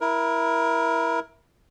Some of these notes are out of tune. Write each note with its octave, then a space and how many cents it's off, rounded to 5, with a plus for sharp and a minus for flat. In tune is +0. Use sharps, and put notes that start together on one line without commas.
E4 +0 A#4 +20